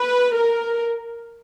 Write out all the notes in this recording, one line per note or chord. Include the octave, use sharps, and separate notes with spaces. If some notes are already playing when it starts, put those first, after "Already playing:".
Already playing: B4
A#4